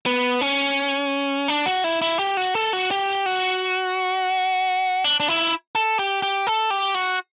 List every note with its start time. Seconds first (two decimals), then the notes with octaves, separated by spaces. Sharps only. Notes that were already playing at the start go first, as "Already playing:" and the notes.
0.06 B3
0.41 C#4
1.48 D4
1.66 F#4
1.84 E4
2.02 E4
2.19 G4
2.37 F#4
2.55 A4
2.73 F#4
2.91 G4
3.26 F#4
5.04 D4
5.20 D4
5.28 E4
5.75 A4
5.99 G4
6.23 G4
6.47 A4
6.70 G4
6.94 F#4